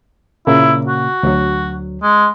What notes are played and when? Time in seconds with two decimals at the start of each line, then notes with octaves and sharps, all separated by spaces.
0.47 A#2 C#3 A#3 E4
0.86 F#4
1.23 D2 F#3
2.03 G#3